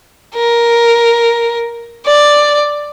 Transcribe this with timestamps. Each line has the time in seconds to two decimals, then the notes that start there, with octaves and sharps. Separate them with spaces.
0.35 A#4
2.06 D5